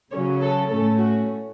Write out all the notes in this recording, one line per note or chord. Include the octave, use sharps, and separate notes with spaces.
C#3 F#3 C#4 C#5
A4
A2 A3 C#4 A4
F#4